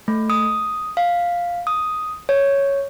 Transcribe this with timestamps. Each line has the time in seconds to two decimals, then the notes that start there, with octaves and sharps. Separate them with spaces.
0.08 A3
0.30 D#6
0.97 F5
1.67 D#6
2.29 C#5